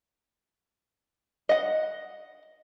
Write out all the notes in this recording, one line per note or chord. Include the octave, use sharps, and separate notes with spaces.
D#5 F#5